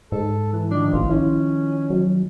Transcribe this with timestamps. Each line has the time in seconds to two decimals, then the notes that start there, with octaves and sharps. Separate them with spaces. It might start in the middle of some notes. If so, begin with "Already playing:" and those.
0.12 G#2 A4
0.53 E3
0.71 D#3 F3 D4
0.93 A1 F4
1.10 C#4 E4
1.90 F#3